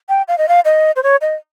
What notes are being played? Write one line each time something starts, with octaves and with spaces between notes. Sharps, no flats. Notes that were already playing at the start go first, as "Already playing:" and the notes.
G5
F5
D#5
F5
D#5
C5
C#5
D#5